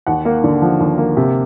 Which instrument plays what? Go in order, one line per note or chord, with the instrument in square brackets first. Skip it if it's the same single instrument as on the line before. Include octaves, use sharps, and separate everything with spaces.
[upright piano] D#2 F#5
A#3
D3
F3
D#2
A#3
C3